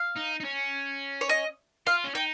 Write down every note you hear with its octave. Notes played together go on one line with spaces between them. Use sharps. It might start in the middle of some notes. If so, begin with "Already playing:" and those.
Already playing: F5
D#4
D#4
C#4
C#5
D#5
F4 F5
C#4
D#4 G5